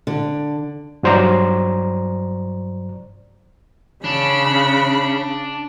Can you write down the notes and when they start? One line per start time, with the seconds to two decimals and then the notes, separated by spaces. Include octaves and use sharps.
0.07 D3
1.03 G2 F#3 C5 D5 A#5
4.04 C#3 D4 B5